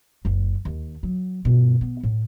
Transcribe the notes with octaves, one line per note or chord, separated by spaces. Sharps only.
F#1 C#2
D#2
F#3
G2 B2
B3
A2